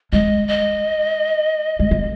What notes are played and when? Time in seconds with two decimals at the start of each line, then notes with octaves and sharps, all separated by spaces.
0.13 G#3 D#5
0.48 D#5
1.79 G#3
1.91 A#3